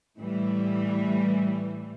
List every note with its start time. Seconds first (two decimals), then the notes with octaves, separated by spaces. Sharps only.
0.18 A2 E3 G3